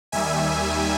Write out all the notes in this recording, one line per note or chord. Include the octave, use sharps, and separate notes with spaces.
D#2 D#3 G3 E5 G#5